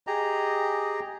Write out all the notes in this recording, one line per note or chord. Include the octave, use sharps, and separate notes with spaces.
G4 G#4 D#5 A#5